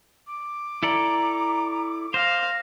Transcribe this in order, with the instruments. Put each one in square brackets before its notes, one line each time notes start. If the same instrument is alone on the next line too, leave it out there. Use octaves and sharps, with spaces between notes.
[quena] D6
[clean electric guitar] E4 A4 D5 [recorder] A#5
[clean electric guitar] C5 [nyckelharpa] F5 [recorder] A#6